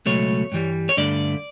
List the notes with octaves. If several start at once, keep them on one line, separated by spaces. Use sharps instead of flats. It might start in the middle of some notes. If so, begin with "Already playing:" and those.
C#2 B2 F#3 A3 C#5
G2 E3 G3
C#5
G2 D3 A3 D5